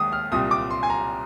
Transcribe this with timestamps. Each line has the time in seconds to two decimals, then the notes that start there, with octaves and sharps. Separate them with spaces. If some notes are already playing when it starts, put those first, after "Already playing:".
Already playing: D#2 D#3 G#3 D#6
0.13 F6
0.32 C2 A#2 G3 D#6
0.51 D6
0.70 C6
0.83 G#5
0.90 A#5